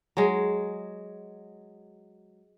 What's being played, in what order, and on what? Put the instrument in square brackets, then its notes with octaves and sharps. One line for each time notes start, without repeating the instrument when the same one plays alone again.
[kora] F#3 G#3